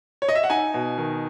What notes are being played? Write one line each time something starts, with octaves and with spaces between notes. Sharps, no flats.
C#5
D#5
E5
F#5
D#4 G#5
B2
D#3